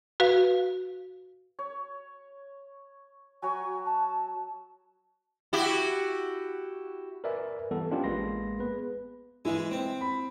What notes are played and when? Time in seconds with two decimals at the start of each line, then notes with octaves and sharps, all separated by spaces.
0.20 F#4 B4 F5
1.59 C#5
3.42 F#3 F#4 C#5 G#5
3.85 A5
5.53 E4 F#4 G4
7.24 A#4 B4 D5 E5 G#5
7.71 E3 G3 B3 A4
7.90 A#3 B3 C#4 D4 F4 G4
8.04 A1 G#3 A#3 B4 C6 A#6
8.59 B3 G#4 B4
9.45 E3 G#3 E4
9.71 C4
10.01 B5